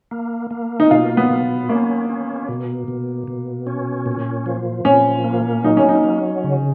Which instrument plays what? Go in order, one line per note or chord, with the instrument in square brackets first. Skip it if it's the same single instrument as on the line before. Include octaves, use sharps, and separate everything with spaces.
[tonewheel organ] A#3
A#3
[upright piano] D#4
[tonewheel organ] B2 [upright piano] F4
[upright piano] B3
[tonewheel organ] B2
[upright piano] A#3 [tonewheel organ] C#4
[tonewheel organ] C#4
B2
B2
B2
C#4
A#2
F3
[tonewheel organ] A#2 [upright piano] C#4
[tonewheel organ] A#3
[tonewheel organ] F#3 [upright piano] D#4
[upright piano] C#4
D#4
[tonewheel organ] F#3
C#3